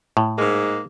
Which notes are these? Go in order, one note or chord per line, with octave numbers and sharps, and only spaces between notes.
A2
G#2 G#3 A#3